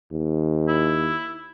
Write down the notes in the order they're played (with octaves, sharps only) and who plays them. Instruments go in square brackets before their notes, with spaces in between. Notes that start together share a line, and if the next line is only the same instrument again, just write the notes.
[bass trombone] D#2
[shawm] E4